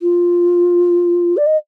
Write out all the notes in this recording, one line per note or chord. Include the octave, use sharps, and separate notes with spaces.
F4
D5
D#5